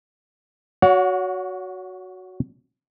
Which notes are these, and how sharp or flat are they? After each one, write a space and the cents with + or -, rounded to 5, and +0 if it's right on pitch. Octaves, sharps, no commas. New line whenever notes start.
F#4 +0 C#5 +30 F#5 -30